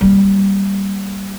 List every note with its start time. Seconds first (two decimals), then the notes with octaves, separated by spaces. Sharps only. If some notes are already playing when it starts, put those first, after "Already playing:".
0.01 G3 A#3